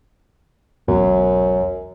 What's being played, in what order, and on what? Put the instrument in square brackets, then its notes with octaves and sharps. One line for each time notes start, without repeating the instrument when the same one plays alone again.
[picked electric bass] E1 B1 B2 [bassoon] F#2